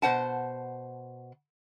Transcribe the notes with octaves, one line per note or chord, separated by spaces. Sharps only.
B2 C5 F#5 A5